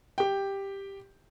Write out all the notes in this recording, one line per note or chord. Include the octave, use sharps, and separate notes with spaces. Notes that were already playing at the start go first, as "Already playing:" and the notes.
G4 G5